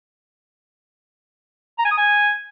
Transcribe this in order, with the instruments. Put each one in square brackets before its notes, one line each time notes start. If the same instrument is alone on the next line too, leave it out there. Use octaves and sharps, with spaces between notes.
[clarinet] A#5
G#5
D#6
G#5